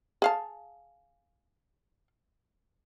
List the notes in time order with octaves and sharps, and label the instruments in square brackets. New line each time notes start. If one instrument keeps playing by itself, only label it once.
[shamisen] G#4 F5 A5